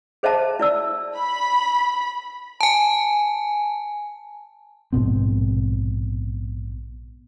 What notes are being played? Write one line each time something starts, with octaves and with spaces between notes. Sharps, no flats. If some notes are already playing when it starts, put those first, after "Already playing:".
G#4 C5 D#5 E5 A5 A#5
E4 D5 E6
B5
G#5 A5
A#1 G#2 B2 C4